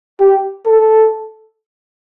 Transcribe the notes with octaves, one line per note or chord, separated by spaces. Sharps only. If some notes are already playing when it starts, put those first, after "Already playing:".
G4
A4